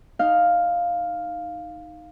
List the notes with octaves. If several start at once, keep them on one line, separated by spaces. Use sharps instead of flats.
D#4 F5